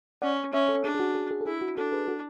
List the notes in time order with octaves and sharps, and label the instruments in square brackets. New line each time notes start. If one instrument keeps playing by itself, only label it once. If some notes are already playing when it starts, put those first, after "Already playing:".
[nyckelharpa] C#4 [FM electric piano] D5 F#5
[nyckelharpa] C#4 [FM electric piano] C#5 E5
[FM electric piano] A4 C#5
[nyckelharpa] D4 [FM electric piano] G#4
[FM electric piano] G#4
F#4
G#4
G#4
A4
[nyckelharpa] E4 [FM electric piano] G#4
[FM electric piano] F#4
[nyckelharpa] D4 [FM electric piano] F#4 A4
[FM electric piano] G#4 B4
F#4 A4